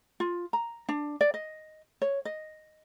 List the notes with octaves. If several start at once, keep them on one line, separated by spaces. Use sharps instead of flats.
F4
A#5
D4
D5
D#5
C#5
D#5